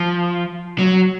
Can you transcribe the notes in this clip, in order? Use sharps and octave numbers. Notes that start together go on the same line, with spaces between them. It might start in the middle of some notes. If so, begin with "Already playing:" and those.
Already playing: F3
F#3